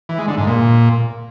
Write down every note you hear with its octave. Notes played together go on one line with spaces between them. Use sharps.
E3
G#3
D3
G#2
A#2